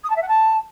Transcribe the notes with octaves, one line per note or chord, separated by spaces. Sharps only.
D#6
A5
E5
F#5
A5